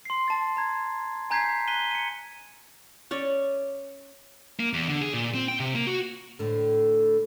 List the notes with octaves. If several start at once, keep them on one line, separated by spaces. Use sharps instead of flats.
C6 C7
A5 A6
A#5 G#6
G#5 A#5 G6 G#6 B6 C7
F#6 B6 D#7 G7
C#7 D#7
C#4 C#5 D5
A#3
E2
D3
G#4
A#2
C4
G5
C3
A#3
F#4
A2 D3